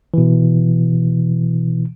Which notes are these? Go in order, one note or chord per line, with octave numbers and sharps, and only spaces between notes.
B2 E3